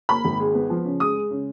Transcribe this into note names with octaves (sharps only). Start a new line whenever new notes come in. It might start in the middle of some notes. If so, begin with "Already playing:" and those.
A#3 B5
G#1
G#3
B3
F3
C#3
G#3 D#6
G#3
C#3